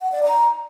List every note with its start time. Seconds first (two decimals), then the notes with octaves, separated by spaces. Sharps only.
0.01 F#5
0.12 D5
0.23 A#5